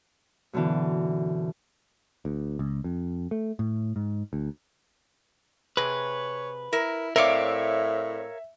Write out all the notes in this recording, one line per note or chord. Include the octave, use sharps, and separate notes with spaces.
F#2 B2 D3 E3
D2
C#2
F2
A3
A2
G#2
D2
C3 G#4 B4 C#5
E4 A#4
A2 C4 A#4 C#5 D5 E5 F5